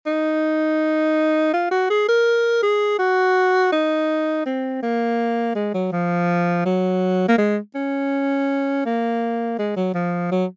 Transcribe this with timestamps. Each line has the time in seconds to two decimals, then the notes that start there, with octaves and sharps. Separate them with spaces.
0.06 D#4
1.54 F4
1.71 F#4
1.90 G#4
2.08 A#4
2.63 G#4
2.99 F#4
3.72 D#4
4.46 C4
4.83 A#3
5.55 G#3
5.74 F#3
5.92 F3
6.65 F#3
7.28 A#3
7.38 G#3
7.75 C#4
8.86 A#3
9.59 G#3
9.76 F#3
9.94 F3
10.32 F#3